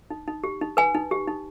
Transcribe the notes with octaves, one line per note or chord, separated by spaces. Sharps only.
D#4
D#4
G4
D#4
B4 G#5
D#4
G4
D#4